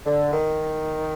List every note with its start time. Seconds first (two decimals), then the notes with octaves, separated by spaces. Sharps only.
0.05 D3
0.33 D#3